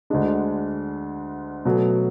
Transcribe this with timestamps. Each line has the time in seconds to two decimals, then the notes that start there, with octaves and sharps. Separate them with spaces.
0.10 D2 D3 G#3 D4
1.65 B2 F#3 A3